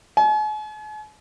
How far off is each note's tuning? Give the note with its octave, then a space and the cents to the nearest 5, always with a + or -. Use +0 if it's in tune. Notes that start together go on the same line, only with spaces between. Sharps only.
G#5 +45